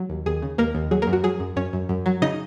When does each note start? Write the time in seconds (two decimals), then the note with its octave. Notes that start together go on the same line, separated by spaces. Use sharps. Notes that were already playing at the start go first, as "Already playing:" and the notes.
Already playing: F#3
0.10 D#2
0.26 D#2 G#4
0.42 C#3
0.58 D#2 A#3 A#4
0.75 D#2
0.91 F#3 G#4
1.02 A#3 A#4
1.07 F#2
1.13 F#4
1.24 F#3 G#4
1.40 F#2
1.56 F#2 C#4 C#5
1.73 F#2
1.89 F#2
2.06 F#3
2.22 C#3 D#4 D#5